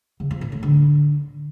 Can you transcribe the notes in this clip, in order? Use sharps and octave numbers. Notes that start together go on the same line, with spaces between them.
C#3
F3
A#2
A2
D3